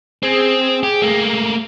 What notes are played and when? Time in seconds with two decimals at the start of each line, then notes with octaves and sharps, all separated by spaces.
0.23 C4 G#4
0.83 G4
1.02 A3 A#3